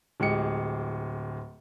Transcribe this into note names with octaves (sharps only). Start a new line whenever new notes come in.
D1 G#3 G4 C#7